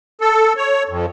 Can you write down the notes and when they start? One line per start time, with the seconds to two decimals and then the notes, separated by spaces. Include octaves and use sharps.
0.21 A4
0.57 C#5
0.89 F2